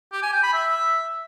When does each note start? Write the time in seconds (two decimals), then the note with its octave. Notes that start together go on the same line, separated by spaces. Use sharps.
0.12 G4
0.22 G#5
0.33 G5
0.43 B5
0.53 E5